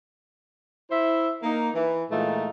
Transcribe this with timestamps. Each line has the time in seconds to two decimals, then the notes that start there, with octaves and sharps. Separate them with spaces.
0.91 E4 C5 E5
1.43 A#3 D#4
1.75 E3
2.10 A#2 E3 G#3 A3 D#4 F4